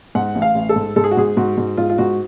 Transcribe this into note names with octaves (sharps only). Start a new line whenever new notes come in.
G#2 F#5
A1
F5
A1
A4
G#2
G#2 A4
G#4
F#4
G#2 G#4
G#2 F#4
G#2
G#2 F4
F4
G#2 F#4